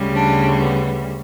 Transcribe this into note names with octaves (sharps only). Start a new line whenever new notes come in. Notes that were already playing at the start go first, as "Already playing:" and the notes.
Already playing: D2 C#3 G3
D4
B3